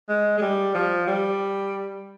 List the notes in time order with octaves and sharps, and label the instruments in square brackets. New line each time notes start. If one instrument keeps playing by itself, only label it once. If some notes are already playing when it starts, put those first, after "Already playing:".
[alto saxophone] G#3
G#3
G3
F3
G3